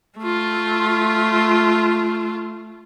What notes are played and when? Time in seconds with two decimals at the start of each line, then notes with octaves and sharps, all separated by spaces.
0.18 A3 F4